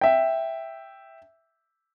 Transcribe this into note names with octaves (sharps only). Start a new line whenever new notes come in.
E5 G5